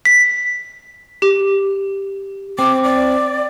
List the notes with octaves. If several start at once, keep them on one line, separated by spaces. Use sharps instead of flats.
B6
G4
C4 D6
D5